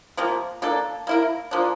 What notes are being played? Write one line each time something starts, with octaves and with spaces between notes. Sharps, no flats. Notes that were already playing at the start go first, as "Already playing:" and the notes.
C3 F3 A#3
A#3 D4 A4
A#3 E4 A#4
F3 A#3 D4